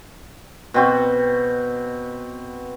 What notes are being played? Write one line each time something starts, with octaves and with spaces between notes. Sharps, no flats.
B2 C4 F#4